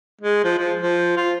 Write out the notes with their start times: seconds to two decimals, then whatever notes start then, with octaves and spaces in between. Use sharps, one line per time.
0.21 G#3
0.44 F3
0.58 F3
0.80 F3
1.17 F4